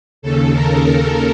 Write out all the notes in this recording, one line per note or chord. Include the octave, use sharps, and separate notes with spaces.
D#2 C#3 A4
A#4
A#4